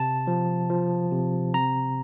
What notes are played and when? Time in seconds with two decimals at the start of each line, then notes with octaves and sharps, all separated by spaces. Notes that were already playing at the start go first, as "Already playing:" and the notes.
Already playing: C3 A5
0.27 F3
0.70 F3
1.12 C3
1.54 C4 A#5